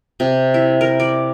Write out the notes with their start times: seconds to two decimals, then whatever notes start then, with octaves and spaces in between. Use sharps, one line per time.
0.20 C3
0.54 E4
0.81 A#4
1.00 D5